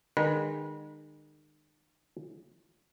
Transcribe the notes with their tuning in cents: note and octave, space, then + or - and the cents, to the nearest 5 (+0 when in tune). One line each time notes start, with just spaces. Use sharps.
D#3 -35 G#3 -35 B4 -35